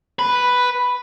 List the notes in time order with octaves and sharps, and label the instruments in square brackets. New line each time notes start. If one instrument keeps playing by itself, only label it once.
[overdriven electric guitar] B4